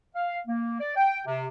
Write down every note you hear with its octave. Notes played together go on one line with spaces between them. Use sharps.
F5
A#3
D5
G5
C3